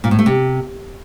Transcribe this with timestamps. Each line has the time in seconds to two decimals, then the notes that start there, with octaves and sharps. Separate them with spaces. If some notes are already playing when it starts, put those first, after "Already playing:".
0.04 A#2
0.11 A2
0.19 A3
0.26 C3